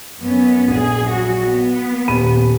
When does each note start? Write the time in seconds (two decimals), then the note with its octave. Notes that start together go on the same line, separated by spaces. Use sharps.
0.19 F#2 B3 C#4
0.67 A#1 F#2 G#4
1.08 F#3 F#4
1.42 B3
2.08 D#1 B5 D#7